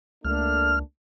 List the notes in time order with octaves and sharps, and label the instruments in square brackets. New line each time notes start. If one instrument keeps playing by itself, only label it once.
[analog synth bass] C#2 [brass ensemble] A3 A#3 D4 [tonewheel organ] F6